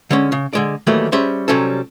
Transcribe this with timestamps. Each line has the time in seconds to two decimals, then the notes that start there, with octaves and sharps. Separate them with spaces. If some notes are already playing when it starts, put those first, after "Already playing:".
0.11 D3 G#3 C#4
0.32 C#3
0.53 D3 G#3 D5
0.87 D#3 E3 F#3 G3 A3 A#3
1.12 G3 C#4 G#4 C5 E5
1.48 C3 F#3 G3 C#4 A4